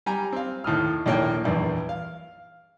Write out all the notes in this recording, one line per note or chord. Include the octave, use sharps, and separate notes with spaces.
G3 G#5 A#5
C4 F5
D#2 A2 D#6 F6
A#1 D#2 A2 A#3 C#5 G5
A#1 E2 G2
F5